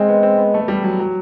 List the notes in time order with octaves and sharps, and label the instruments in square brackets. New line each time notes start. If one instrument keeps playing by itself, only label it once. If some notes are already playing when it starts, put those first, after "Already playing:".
Already playing: [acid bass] G#3 [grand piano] C4
[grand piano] B3
C4
B3
A3
G3
F#3
F#3